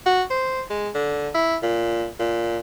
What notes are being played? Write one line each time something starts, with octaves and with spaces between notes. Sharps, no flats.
F#4
C5
G#3
D3
E4
A#2
A#2